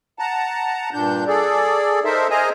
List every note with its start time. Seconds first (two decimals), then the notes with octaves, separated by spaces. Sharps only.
0.19 F#5 A5 A#5
0.93 G2 A#2 D4 G6
1.27 G#4 A4 D5
2.05 D#4 A4 A#4 C5 E5
2.30 G#4 A#4 C5 D#5 G#5 A#5